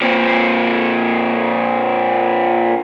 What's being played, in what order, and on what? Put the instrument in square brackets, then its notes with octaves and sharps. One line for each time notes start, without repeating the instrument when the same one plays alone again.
[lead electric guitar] A#2 C4